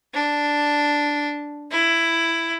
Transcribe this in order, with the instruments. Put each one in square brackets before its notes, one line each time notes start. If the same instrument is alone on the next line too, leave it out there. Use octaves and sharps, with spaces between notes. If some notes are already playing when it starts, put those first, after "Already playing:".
[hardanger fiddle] D4
E4